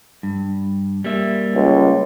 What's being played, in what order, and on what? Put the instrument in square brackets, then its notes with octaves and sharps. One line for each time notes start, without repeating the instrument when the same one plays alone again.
[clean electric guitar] G2
G3 A#3 E5
[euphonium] C#2